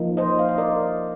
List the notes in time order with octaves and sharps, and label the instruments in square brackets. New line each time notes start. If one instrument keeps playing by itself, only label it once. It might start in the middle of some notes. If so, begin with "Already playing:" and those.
Already playing: [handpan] F3 A#3 D#4
C5 D#5
F5
D#5
A#4 D5